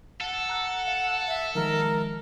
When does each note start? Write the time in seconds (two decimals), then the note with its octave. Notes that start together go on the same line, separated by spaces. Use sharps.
0.21 A4 F#5
0.49 A#5 F#6
0.87 F5
1.28 E5
1.55 D#3 F3 G#3 A#4